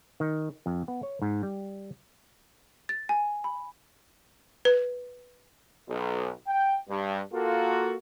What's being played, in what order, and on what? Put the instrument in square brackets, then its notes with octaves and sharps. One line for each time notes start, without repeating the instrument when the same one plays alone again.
[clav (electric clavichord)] D#3
F2
B3
C#5
G#2
G3
[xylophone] A6
G#5
B5
[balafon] B4
[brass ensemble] B1
G5
G2
A#3 F4 F#4 A4